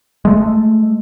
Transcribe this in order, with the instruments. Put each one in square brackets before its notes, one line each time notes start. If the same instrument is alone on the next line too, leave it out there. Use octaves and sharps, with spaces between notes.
[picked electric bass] G#3 A3